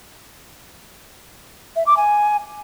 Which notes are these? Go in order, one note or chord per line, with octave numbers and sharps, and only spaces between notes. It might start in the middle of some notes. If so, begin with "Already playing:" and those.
E5
D6
G#5